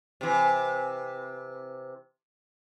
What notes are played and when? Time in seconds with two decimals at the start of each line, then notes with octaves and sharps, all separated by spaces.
0.21 C3 E3